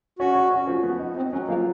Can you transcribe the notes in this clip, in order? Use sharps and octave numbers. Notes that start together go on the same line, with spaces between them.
C#4 F#4
C#4
C#4
F3
B3
D#4
C4 D#4
F#3 C#4
F3 A#3